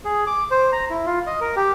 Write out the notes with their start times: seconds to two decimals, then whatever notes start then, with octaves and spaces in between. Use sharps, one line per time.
0.05 G#4
0.27 D6
0.51 C5
0.73 A#5
0.90 E4
1.06 F4
1.27 D#5
1.41 A#4
1.56 G4